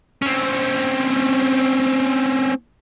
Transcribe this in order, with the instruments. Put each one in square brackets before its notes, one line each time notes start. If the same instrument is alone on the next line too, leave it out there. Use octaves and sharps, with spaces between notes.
[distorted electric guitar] C4 C#4